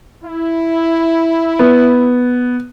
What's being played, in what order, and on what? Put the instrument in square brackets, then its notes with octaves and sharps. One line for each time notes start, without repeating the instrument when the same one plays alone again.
[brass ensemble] E4
[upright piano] B3